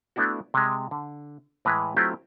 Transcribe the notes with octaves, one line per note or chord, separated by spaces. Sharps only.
A3 B3 D4 E4 F#4
C3 G#3
D3
A2 E3 G#3 B4 A#5
F#3 A3 C4 E4 F4 G4